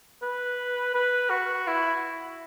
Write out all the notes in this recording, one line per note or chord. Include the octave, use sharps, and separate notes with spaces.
B4
B4
F#4
E4